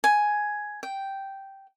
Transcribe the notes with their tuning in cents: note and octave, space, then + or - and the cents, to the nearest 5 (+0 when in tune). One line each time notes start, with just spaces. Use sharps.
G#5 +5
G5 -5